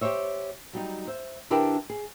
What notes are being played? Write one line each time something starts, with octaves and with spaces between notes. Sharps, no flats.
G4 G#4 C5 C#5 E5
F#3 G3 D#4
C5 E5
D3 D4 E4 G4 A#4 B4
G#4